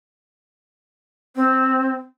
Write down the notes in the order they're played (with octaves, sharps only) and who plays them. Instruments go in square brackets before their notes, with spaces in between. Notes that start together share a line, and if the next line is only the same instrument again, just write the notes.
[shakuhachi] C4